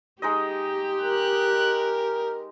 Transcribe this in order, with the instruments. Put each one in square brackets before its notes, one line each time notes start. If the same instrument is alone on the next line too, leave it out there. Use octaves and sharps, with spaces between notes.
[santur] G#3 D#4 D#5 [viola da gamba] G4
[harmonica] A#4 [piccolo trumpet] F#6